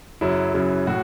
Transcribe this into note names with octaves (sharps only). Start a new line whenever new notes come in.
F#2 C#3 F#3 E4
F#2 C#3 F#3
A2 F#4